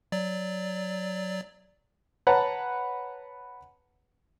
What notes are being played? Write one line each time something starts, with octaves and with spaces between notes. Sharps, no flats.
F#3 D5
B4 C#5 F#5 A5 A#5